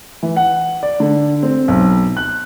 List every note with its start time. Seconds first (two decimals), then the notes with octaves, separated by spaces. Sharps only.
0.23 E3
0.36 F#5
0.83 D5
1.00 D3
1.43 C4
1.68 B1
2.17 F#6